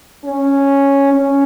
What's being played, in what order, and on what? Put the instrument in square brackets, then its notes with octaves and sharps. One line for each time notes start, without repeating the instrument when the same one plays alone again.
[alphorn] C#4
C#4